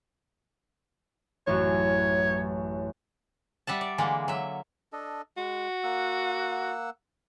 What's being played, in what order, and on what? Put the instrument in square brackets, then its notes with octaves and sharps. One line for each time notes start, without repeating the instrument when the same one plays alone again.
[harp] A1 F#2 F#4 [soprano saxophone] C#5
[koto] G3 E5 F#5 A5
D5
D3 E3 G#3 A#3
F#3 E5
[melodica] D4 A4 D#5
[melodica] G#3 [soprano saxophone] F#4
[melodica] A#3 F#5 E6